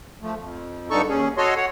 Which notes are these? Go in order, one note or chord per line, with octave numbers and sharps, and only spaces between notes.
F3 A3
F2
G2 D3 D#4 A4 C#6
D#2 C#4 G#4
F#4 A4 C#5 D#5 C6
C#5 F#5